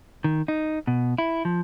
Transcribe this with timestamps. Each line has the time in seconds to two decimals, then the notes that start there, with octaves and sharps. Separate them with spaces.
0.24 D#3
0.48 D#4
0.87 B2
1.18 E4
1.45 F3